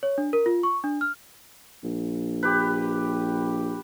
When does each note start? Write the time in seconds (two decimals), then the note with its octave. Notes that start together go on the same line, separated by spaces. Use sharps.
0.03 C#5
0.18 D4
0.33 A#4
0.46 F4
0.63 C#6
0.84 D4
1.01 F6
1.83 A#1
2.43 G4 B4